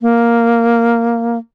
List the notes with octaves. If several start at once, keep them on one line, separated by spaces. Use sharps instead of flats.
A#3